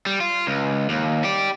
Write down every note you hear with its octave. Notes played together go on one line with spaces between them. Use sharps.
G3
F4
C#2
D#2
G4 D5